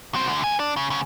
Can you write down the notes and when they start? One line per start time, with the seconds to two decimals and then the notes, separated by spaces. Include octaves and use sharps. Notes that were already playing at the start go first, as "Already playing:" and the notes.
0.14 F#3 C4
0.27 D2 D3
0.44 D#2 G#5
0.59 D4
0.76 C#3
0.90 D2 C#3